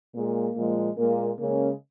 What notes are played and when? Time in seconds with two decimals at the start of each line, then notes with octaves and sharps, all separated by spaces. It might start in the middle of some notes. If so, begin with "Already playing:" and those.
0.14 A#2 G#3 A#3
0.56 A#2 F3 G#3
0.97 A#2 G#3 A#3
1.39 C#3 G#3 A#3 C#4